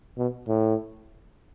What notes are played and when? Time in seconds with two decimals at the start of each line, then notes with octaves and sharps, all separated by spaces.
0.18 B2
0.48 A2